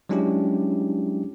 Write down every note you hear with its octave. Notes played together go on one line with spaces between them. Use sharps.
F#3 G#3 C#4 D4 E4 G4